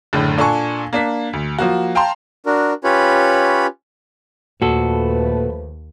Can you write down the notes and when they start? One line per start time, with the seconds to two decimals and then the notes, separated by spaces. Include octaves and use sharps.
0.13 F#1 A2 D3
0.37 A#2 D4 A4 G#5 C#6
0.93 A#3 D4 B6
1.33 D2
1.59 F3 A#3 F#4
1.95 F5 G5 A5 A#5 C6
2.46 D4 F#4 A#4
2.84 C#4 F4 G4 B4 C#5 B5
4.62 D#2 A#2 F3 A3 F#4 A4 B4